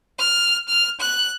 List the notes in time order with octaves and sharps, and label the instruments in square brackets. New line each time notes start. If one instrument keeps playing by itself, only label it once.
[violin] F6
F6
F#6